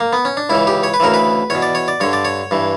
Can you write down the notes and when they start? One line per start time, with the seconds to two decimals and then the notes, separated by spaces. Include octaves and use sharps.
0.00 A#3
0.13 B3
0.25 C#4
0.37 D4
0.50 C#2 C#3 E3 E4
0.67 G4
0.83 C#5
0.94 B4
1.00 D2 C#3 E3 A#4
1.14 B4
1.50 E2 B2 C#5
1.62 D5
1.75 C#5
1.88 D5
2.00 G2 D3 C#5
2.13 D5
2.25 C#5
2.51 G2 E3